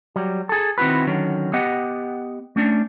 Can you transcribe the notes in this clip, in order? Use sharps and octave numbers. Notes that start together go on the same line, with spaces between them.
F#3 G3
G#4 A4
D#3 C4 E4 F#4 B4
D3 D#3 F#3 C#4
B3 G4 D#5 F#5
A3 C#4 D4